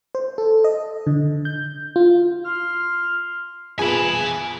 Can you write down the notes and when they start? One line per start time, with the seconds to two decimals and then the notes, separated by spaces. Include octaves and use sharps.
0.15 C5
0.38 A4
0.64 D#5
1.07 D3
1.45 G6
1.96 F4
2.45 C6 F6
3.79 F2 A#2 B3 G#4 G#5 B5